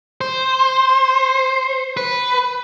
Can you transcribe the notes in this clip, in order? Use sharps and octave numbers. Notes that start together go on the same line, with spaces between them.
C5
B4